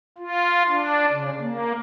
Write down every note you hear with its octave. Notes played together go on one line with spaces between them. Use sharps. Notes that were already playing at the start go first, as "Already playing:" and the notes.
F4
D4
C#3
A#3